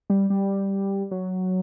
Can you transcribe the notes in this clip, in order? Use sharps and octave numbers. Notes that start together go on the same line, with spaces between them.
G3
G3
F#3